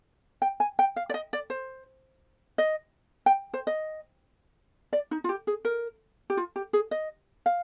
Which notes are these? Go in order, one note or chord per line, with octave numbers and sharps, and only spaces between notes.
G5
G#5
G5
F5
D5
D#5
D5
C5
D#5
G5
C5
D#5
D5
D#4
F4
G4
G#4
A#4
G4
F4
G4
G#4
D#5
F5